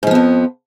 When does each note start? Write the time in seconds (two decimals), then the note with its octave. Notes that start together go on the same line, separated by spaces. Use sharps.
0.03 G#2
0.07 F3
0.11 B3
0.15 F2